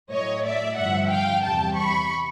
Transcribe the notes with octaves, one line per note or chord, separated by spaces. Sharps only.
A2 F#3 C#5 D#5
D5 E5
G2 D3 F3 E5 F#5
F5 G5
E2 C3 E3 G3 G5 A5
B5 C#6